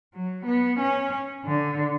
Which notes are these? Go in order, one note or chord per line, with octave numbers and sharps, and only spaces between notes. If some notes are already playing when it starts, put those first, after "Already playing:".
F#3
B3
C#4
D3